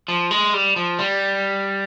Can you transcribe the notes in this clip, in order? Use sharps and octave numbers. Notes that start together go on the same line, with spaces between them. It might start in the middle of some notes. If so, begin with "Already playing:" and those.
F3
G#3
G3
F3
G3